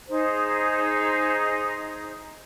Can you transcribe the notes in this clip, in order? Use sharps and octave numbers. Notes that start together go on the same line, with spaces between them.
D#4 G#4 C5